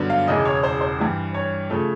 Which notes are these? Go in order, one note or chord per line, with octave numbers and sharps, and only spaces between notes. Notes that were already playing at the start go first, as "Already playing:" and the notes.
Already playing: G2 D3 F#3 B3
F5
E1 E2 C#3 D#5
C#5
C5
C5
G2 E3 G3
C#5
C#3 F3 A3